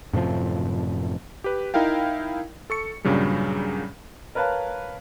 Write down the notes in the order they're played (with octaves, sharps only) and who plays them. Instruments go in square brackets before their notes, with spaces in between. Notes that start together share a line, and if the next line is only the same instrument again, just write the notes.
[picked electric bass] F#2 A2 C3 F3
[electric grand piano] G4 B4
D#4 E4 A#4 F5 G5
A4 C#6 C#7
G2 A#2 C#3 F#3 G3
[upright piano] A#4 B4 C#5 F5 A5